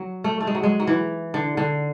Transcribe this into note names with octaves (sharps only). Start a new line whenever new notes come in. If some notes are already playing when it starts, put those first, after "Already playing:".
Already playing: F#3
A3
A3
G#3
F#3
G#3
F#3
E3
D3
D3